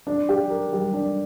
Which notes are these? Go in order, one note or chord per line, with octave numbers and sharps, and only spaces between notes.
D4
G4
A#4
G3
D4